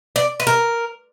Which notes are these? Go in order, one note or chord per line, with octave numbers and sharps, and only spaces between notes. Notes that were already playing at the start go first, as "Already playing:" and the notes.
D5
B4
A#4